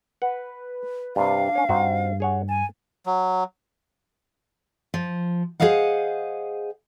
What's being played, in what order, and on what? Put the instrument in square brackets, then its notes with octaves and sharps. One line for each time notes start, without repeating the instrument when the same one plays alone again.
[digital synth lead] B4 [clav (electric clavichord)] F#5
[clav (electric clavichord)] G2 C3 [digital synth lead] D4 [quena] F5
[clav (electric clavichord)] C#4 C#5
[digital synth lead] G2 [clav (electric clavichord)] C4 D#4 F#4
[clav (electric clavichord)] G#4 C#5 F#5
[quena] G#5 [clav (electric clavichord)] A5
[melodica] F#3
[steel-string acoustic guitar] F3
G#4 A4 C5 D#5 F5 F#5